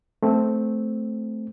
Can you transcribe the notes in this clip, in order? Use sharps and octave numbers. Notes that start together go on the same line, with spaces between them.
A3 C4